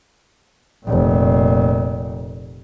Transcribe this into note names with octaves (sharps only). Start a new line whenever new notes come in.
F1 A#2